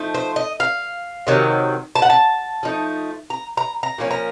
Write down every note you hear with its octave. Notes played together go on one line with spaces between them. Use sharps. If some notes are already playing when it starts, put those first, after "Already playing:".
Already playing: F3 A3 D#4
C5
D#5
F5
C3 D#3 F#3
A5
F#5
A5
F3 A3 D#4
A#5
A#5
A#5
A#2 F3 A#3 C#4
A#5